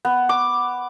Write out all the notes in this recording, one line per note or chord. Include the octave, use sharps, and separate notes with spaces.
B3
D6